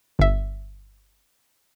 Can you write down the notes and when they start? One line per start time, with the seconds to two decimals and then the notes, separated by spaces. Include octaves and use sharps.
0.19 G1 E5